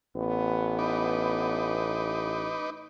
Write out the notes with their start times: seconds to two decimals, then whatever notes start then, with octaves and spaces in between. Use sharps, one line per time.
0.17 A1 B3
0.79 D#4 B4 D6